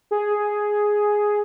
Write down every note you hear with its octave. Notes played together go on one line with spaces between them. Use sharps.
G#4